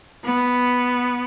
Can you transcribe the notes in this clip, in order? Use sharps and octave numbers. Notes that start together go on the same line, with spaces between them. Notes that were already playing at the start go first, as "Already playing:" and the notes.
B3